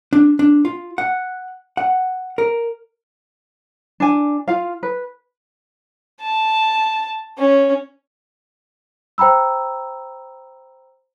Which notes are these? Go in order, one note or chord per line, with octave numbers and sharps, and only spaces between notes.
D4
D4
F4
F#5
F#5
A#4
D4 G#5
F4 F5
B4
A5
C#4
C5 G5 A#5 B5 E6